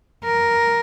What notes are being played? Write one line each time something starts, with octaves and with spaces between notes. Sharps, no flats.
A#4